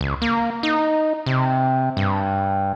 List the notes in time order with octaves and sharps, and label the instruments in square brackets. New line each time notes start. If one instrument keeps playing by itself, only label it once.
[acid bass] C#2
A#3
D#4
C3
G2